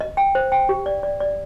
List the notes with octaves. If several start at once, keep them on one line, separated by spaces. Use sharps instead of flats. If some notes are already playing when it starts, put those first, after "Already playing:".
D#5
G5
C5
G5
G4
D5
D5
D5